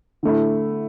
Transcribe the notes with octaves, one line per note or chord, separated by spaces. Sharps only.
D3 A3 E4